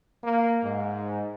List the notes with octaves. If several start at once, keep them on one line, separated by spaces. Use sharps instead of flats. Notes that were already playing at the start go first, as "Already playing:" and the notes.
A#3
G#2